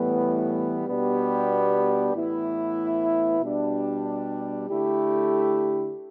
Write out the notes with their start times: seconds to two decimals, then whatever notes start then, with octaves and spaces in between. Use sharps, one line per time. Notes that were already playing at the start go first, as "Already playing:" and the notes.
Already playing: A2 E3 G3 B3
0.88 B2 G3 B3 D4 G4
2.15 A2 E3 B3 E4
3.40 B2 G3 D4 G4
4.68 D3 A3 E4 G4